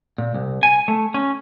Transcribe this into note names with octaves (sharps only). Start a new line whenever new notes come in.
A#2
C2
G#5
A3
C#4